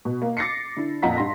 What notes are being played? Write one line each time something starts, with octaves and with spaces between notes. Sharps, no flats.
B2
A#3
D6 A6 A#6 C7 C#7
D3 E4
F2 A#2 D#5 F#5 A#5 B6
G2 C6 A#6